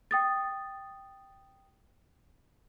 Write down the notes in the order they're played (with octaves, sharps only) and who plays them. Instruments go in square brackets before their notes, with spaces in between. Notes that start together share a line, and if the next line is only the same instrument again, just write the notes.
[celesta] G5 D#6 A6